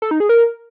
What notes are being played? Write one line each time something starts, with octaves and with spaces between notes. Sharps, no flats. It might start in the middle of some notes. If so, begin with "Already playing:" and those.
A4
D#4
G#4
A#4